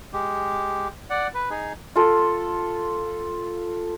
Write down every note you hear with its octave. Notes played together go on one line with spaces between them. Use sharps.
G#3 G4
D5 F#5
B4
D#4 G#4
F4 A4